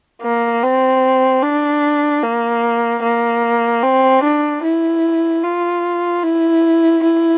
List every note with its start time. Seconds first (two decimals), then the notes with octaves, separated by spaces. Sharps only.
0.22 A#3
0.63 C4
1.43 D4
2.23 A#3
3.03 A#3
3.83 C4
4.23 D4
4.63 E4
5.43 F4
6.23 E4
7.03 E4